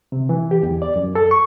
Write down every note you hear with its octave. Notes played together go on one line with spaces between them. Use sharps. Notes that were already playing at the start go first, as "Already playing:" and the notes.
C3
E3
G4
E2
D5
F#2
A4
C#6